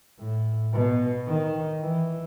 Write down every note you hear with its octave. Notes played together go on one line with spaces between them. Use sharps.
A2
B2
D#3
E3